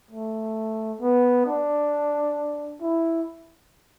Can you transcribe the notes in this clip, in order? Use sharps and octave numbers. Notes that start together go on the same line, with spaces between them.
A3
B3
D4
E4